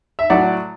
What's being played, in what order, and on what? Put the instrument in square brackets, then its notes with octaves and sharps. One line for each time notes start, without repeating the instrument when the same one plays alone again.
[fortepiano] E5
A2 F#3 D5 F#5